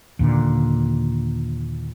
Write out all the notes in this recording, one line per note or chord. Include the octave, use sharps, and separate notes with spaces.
D#2 A#2 D3